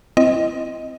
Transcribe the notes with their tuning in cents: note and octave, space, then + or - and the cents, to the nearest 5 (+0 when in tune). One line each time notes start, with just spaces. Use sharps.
C4 +0 E4 +25 D#5 +10